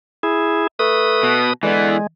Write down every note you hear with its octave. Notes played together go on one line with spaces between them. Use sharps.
E4 G#4
A3 B4 D#6
B2
D3 E3 G#3 B3